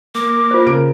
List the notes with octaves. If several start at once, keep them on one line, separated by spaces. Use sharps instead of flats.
A#3 D6
F4 C5
C#3 A#4 D7